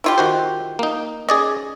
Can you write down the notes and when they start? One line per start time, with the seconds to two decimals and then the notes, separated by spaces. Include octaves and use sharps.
0.04 E4 F4 G4
0.18 D#3 F#4 C5
0.79 A#3 D#4
1.29 C#4 G#4 D5 D#5